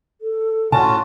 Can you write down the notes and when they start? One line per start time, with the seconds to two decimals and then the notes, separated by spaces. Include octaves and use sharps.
0.21 A4
0.72 A2 C#4 F4 F#4 F#5 A5